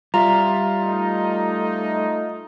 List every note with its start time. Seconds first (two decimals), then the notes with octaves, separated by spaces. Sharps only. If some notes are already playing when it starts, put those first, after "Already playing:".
0.14 G3 F4 D5 E5 A#5
0.82 A3 D#4